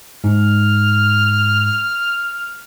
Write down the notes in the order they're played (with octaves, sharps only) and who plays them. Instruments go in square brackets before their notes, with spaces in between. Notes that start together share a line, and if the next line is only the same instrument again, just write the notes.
[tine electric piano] G#2 [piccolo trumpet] F6